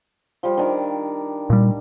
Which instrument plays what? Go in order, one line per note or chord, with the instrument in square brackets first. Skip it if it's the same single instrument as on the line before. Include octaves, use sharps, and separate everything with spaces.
[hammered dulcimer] F3 G3
D#3 D4 A#4
[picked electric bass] A#2 G3